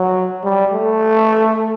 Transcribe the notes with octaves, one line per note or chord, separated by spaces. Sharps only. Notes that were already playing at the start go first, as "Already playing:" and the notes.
Already playing: F#3
G3
A3